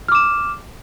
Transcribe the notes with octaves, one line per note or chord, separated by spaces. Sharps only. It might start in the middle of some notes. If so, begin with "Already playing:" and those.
D6 F6 E7